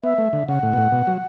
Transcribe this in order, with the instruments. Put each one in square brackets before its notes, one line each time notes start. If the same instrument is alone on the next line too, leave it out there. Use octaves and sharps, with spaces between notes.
[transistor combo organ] B3 [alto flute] E5
[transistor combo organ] A3
D3
[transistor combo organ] C#3 [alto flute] F#5
[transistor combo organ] A2
B2
A2
B2
F#3